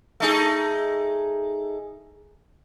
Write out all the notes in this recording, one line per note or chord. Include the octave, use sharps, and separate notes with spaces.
A3 D#4 G#4